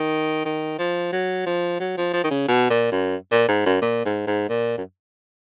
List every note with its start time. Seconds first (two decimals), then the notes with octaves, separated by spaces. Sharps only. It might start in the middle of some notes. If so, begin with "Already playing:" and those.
Already playing: D#3
0.46 D#3
0.79 F3
1.12 F#3
1.46 F3
1.80 F#3
1.97 F3
2.13 F3
2.24 D#3
2.31 C#3
2.48 B2
2.70 A#2
2.92 F#2
3.31 A#2
3.48 G#2
3.66 F#2
3.82 A#2
4.05 G#2
4.27 G#2
4.49 A#2
4.78 F#2